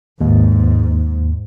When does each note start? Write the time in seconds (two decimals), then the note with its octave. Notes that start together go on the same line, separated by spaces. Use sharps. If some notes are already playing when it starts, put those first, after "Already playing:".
0.21 D#2 G#2